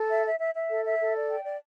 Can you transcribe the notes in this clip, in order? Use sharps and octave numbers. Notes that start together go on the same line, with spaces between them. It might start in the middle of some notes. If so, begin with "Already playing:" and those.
Already playing: A4
E5
E5
E5
E5
A4
E5
A4
D5
G5
D5